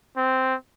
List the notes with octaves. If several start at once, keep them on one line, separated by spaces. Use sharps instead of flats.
C4